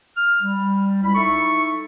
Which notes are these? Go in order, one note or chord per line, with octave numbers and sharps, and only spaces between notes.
F6
G3
C#2 C#4 E4 B5
D#4 E4 A4 E5 C#6